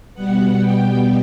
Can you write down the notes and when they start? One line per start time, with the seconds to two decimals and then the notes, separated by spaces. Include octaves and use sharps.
0.14 B2 G3 B3 F#5
0.59 G5